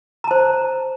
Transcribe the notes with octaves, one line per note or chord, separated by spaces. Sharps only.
C5 A5 A#5